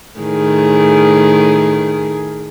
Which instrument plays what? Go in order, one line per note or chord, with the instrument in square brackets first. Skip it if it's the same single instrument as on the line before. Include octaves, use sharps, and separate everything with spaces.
[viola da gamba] A2 D#3 G#4